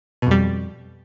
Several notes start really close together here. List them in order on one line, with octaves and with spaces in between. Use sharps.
B2 F2 G3